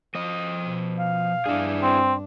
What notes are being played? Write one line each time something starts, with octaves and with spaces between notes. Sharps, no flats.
F3 D#5
B2
F5
G2 D4 E4 G#4
C4